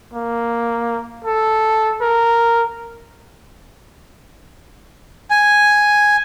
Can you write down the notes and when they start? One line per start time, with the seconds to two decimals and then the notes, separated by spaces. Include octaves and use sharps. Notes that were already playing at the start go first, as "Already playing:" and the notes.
0.14 A#3
1.24 A4
2.01 A#4
5.30 G#5